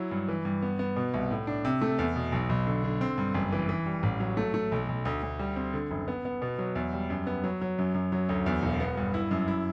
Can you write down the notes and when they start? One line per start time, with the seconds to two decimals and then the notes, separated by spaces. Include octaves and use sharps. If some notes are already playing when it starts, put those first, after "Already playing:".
Already playing: F#3 E4
0.11 G2
0.28 E3
0.45 G2
0.62 B3
0.79 B3
0.96 B2
1.14 C2
1.31 A2
1.47 D4
1.65 C3
1.81 A3
1.99 E2
2.16 B2
2.32 B1
2.49 B1
2.67 D3
2.84 D3
3.01 C4
3.18 G2
3.34 F#1
3.52 E3
3.69 E3
3.86 G3
4.03 A1
4.20 F#3
4.37 A3
4.54 A3
4.72 B1
4.89 B1
5.05 D2
5.23 D2
5.39 G3
5.56 C4
5.73 D3
5.91 F#1
6.08 B3
6.25 B3
6.42 B2
6.58 F#3
6.75 E2
6.93 G3
7.10 F#2
7.27 B3
7.44 F#3
7.61 F#3
7.78 F#2
7.95 F#2
8.12 F#3
8.29 D2
8.46 E2
8.63 E1
8.80 B3
8.97 G2
9.14 E4
9.31 F#2
9.48 E4